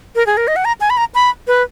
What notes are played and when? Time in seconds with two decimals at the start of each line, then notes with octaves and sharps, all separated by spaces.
0.16 A#4
0.27 G#4
0.37 A#4
0.48 D#5
0.56 F#5
0.65 A#5
0.81 G#5
0.90 B5
0.97 A#5
1.15 B5
1.47 B4